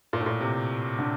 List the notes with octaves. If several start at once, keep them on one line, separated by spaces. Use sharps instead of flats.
A#2
A2
A#2
C3
D3